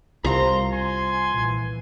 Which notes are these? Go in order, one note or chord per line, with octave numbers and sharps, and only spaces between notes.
C2 F4 C5 F5 A#5 C6
G#5 C6
A#1 A#2 E3